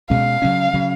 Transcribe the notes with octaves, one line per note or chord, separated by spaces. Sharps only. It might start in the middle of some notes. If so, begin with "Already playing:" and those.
B2 G#3 C#4 F5
C#3 F#3 C#4
C#3 F#3 C#4